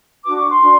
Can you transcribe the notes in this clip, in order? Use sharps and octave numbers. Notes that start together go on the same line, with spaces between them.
D4 F#4 B4 D6
C#6
C6
D4 F#4 B4